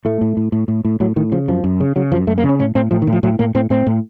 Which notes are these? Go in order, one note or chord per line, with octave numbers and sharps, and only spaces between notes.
A2 A3
A2
A2
A2
A2
A2
A2 F#3
A2 D#3
C#3 F3
F#2 F3
F#2
C#3
C#3 F#3
F#2 F3
F#2 A3
A#3
C#3
C#4
A2 C#4
A2 C4
A2 F3
D#3
A2
F3
A2 F#3
A2 A#3
A2 C4
A2 C4
A2